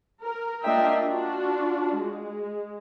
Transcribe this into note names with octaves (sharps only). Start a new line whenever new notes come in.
A#4
A#3 D4 F4 D#5 E5 G5
D4 F4 F#4
G#3